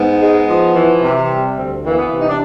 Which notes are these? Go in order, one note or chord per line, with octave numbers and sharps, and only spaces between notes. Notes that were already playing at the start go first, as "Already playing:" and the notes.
Already playing: G#2 B3
G#3
F3
E3
C3
G3
D2 C4
E3 A#3
B3
C3
D#4
D4